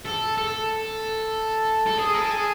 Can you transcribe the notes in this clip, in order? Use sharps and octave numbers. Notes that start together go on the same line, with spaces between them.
A4
A4
A4
G#4
A4
G#4